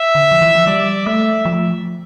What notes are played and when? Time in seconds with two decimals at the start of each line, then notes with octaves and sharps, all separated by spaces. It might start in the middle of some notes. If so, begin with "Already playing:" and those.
Already playing: E5
0.15 D3
0.32 F3
0.41 E3
0.55 F3
0.67 G3 D5
1.06 A3 E5
1.45 F3